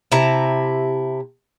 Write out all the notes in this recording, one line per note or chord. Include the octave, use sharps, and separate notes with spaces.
C3 E4 A5 A#5